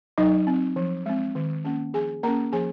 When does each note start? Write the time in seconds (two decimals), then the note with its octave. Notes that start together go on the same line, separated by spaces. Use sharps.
0.18 F#3 D#4 D#5
0.47 C4
0.76 F3
1.06 G#3 C4
1.35 D#3
1.65 A#3 C#4
1.93 F3 G#4 G#5
2.23 A#3 C#4 A#4 A#5
2.52 F3 G#4 G#5